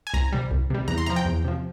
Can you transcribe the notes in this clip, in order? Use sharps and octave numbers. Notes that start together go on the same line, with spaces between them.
G#5
C2 A#5
C3 G3
C2
C3 G3
E2 A#5
C6
C3 F3 A#5
G5
E2
C3 F3